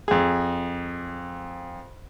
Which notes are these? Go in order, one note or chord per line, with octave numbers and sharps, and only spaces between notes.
F2 G#4